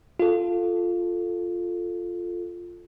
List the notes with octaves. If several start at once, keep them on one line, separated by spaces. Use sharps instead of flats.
F4 A4